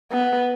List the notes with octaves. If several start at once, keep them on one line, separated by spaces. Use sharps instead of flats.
B3